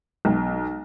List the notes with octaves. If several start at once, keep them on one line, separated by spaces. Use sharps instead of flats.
B1